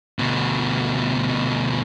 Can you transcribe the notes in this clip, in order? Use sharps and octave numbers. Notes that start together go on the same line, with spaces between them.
D2 B2